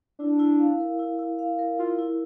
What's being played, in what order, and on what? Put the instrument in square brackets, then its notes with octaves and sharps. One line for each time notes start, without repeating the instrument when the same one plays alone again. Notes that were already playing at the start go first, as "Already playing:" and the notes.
[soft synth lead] D4 [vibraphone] E4
[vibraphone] E4
F5
A#4
E4
E4
F5
A#4
[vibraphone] E4 [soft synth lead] F4
[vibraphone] E4